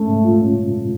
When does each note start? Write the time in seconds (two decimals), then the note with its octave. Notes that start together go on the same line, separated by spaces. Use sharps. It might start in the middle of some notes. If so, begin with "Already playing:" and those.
Already playing: G#3 A3 C#4
0.08 G#2
0.24 F4
0.41 C#4